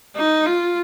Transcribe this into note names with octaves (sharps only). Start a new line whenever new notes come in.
D#4
F4